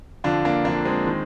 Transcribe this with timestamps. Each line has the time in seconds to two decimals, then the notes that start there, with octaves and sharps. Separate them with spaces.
0.24 F2 D3 F3 D4 F4
0.45 A#3 D4
0.65 F2 D3 F3 A#3 D4
0.85 G#3 C4
1.07 D#3